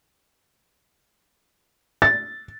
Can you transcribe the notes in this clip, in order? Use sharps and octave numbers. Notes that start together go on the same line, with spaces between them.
A6